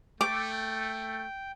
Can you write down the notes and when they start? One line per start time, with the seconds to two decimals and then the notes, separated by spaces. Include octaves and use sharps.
0.21 A3 G5 D6